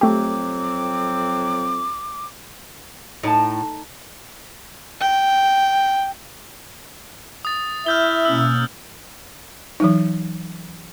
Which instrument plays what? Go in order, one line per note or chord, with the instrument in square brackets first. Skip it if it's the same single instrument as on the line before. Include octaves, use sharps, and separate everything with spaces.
[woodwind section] F2 F#3 C4 [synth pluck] A3 G4 [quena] D6
[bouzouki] A2 [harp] D#4 A5
[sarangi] G5
[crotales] D#6 A6
[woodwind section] E4 E5 [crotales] F6 G6 G7
[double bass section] B2 A#3 C#4 [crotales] E6
[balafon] E3 F#3 D#4